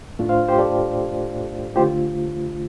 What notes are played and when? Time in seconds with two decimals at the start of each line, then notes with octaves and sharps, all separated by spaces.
0.19 A2 A3 D4 F4
0.29 C5 F5
0.48 G4 C5
0.58 A4 D5
1.76 D3 A3 F4 G4 C5